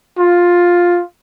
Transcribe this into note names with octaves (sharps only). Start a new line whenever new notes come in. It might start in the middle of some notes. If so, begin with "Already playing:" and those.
F4